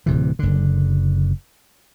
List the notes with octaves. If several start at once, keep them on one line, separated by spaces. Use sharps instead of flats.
D1 C3 E3
F#1 D3